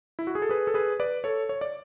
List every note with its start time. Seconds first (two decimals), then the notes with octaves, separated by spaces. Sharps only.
0.19 E4
0.27 F#4
0.35 G#4
0.42 A4
0.49 G#4 B4
0.67 A4
0.74 G#4 B4
1.00 B4 D5
1.24 A4 C#5
1.49 C#5
1.61 D5